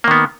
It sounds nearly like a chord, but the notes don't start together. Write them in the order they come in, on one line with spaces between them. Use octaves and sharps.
A#3 D#3 B3